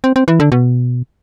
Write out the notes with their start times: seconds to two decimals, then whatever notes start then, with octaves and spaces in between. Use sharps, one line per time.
0.04 C4
0.16 C4
0.28 E3
0.40 D3
0.52 B2